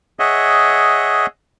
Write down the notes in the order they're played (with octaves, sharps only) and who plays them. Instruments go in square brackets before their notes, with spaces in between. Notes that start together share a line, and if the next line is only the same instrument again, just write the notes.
[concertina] G#4 C#5 D#5 E5 F#5